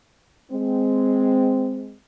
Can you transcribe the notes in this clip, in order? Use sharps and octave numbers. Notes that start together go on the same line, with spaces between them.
G#3 C4